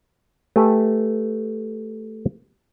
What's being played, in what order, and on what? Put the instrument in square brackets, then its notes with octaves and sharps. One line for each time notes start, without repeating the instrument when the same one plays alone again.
[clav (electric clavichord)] A3 G4 B4 G#5